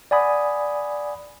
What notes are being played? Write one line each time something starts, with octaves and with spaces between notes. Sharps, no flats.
D5 F#5 G#5 B5 D#6